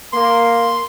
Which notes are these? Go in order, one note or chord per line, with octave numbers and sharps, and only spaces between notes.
A#3 C6